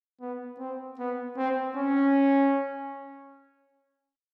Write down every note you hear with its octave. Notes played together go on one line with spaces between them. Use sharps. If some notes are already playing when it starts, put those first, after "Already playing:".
B3
C4
B3
C4
C#4